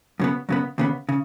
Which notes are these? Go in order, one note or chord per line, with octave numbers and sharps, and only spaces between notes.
F#2 C#3 B3
F#2 C#3 B3
D#2 C#3 B3
C#3